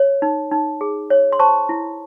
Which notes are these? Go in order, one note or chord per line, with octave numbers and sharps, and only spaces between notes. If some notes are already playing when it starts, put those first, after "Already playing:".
Already playing: C#5
D#4
D#4
G#4
C#5
C6
C5 A5 C#6
E4